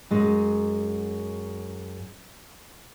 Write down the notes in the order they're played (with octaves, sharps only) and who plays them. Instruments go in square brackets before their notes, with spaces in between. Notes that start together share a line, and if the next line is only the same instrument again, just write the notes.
[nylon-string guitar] F#2 G#3